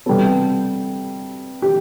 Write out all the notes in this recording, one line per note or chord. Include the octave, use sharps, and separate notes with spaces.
C3 G3 B3 A4
G4